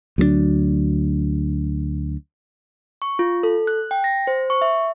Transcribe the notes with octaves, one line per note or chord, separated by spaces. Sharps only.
D2 F#3 A3 D4
C#6
F4
A4
F#6
G5
A#6
C5
C#6
E5